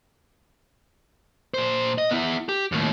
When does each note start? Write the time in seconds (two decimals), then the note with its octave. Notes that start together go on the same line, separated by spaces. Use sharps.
1.54 A#2 C5
1.98 D#5
2.11 B3 E4
2.49 G4
2.72 D#2 A2